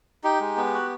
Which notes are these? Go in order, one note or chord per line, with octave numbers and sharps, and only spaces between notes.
D#4 G4
G#3
B3
F#4